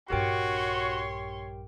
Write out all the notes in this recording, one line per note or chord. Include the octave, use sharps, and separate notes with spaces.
A#1 G2 F#4 G4 A#4 C#5 G5 C6